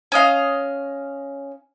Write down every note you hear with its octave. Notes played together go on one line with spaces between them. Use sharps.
C#4 D#5 F5